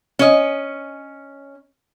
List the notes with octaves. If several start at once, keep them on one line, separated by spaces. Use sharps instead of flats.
C#4 D#5